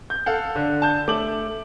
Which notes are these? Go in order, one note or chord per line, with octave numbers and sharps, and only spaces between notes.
G6
A4 F5 F#5
D3
A5 G6
A3 D6 F#7